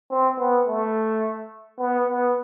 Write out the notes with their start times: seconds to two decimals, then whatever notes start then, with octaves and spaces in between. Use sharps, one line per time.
0.11 C4
0.39 B3
0.67 A3
1.79 B3
2.08 B3